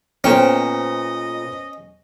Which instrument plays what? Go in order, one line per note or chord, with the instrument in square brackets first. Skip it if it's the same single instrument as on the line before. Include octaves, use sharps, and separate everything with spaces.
[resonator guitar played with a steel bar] A#2 G5 [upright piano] B3 A4 C5 [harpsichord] C#4 [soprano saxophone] D#5